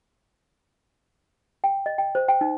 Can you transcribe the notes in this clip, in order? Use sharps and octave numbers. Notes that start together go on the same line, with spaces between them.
G5
D#5
G5
C5
G5
D#4